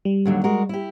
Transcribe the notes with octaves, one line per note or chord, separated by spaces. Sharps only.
G3
D#2 D3 F#3
G#3 F#4 A#4
E4 G4